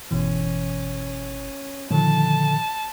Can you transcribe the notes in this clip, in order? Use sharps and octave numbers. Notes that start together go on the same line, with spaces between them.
G1 B2 E3 C#4
A#2 D3 D#3 F3 A5